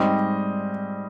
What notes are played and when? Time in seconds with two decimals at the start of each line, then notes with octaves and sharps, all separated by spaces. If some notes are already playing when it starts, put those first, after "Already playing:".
Already playing: G#2 G3 C4 D#5